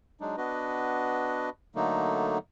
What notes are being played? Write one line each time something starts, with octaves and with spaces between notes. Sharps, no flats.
F#3 G#3 D4 D#4
B3 D4 F#4 B4 D#5
D3 F#3 A3 A#3 D#4